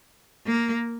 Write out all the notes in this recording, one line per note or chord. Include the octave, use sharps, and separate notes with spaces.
A#3